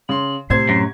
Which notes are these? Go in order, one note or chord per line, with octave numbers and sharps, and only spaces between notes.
C#3 C6 F#7
A2 C3 C5 G#6 C7
F#2